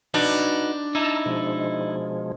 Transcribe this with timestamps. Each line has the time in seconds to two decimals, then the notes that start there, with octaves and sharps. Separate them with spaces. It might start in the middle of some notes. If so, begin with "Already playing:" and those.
0.14 D4 D#4 F#4 B4
0.95 D#4 E4 A5 A#5 E6
1.26 B2 F3 G#3